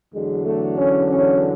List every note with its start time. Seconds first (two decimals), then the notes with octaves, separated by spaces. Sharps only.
0.14 E2 D3 F#3 G#3
0.45 A3
0.76 C#4
1.08 C#4